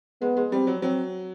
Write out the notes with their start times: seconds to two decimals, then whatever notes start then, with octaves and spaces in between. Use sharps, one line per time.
0.21 G#3 B3
0.37 G#3
0.52 G3 C4
0.67 F#3
0.82 F#3 C4